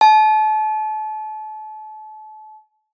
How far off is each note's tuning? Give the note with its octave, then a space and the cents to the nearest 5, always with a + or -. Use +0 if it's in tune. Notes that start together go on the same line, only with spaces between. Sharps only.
A5 -35